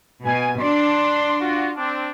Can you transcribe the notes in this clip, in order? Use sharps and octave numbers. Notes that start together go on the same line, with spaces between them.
B2 G#5
D4 C6
F4 F#4
C4 D4